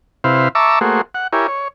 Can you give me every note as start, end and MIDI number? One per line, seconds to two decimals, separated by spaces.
0.24 0.48 48
0.24 0.48 64
0.24 0.48 71
0.24 0.48 72
0.24 0.48 77
0.55 0.79 76
0.55 0.79 81
0.55 0.79 82
0.55 0.79 85
0.55 0.79 86
0.55 0.79 88
0.81 1.01 57
0.81 1.01 58
0.81 1.01 66
0.81 1.01 68
0.81 1.01 72
1.15 1.27 78
1.33 1.47 64
1.33 1.47 67
1.33 1.47 70
1.33 1.47 73
1.33 1.47 80
1.48 1.68 73